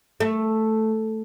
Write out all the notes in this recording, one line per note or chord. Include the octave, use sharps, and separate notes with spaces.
A3